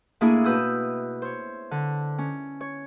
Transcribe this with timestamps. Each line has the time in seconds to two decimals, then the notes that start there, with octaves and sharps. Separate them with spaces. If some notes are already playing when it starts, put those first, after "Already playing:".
0.21 A2 A#3 D4 E4 G#4 D#6
0.44 B2 B4 D#6 E6 G6
1.22 C5 C#5
1.71 D3
2.18 C#4
2.61 C#5